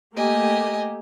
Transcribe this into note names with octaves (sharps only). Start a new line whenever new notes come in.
A3 A#3 G4 D#5 G#5